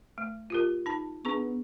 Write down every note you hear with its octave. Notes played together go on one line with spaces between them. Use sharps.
A3
F4 G4 A#4
D#4 A5
B3 D4 G#4 C#6